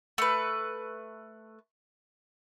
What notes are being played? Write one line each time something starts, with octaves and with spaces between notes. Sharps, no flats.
A3 B4